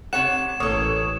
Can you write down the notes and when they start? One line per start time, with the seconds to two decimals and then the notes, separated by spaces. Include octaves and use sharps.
0.13 C3 C#5 F#5 F#6 E7
0.60 A1 A#3 A4 C#5 D#6